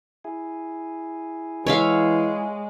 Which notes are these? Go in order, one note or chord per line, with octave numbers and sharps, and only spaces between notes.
E4 G#4
E3 G#3 C#5 E5 F5